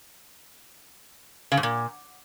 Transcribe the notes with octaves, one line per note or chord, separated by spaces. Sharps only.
C#3
G#2
A#2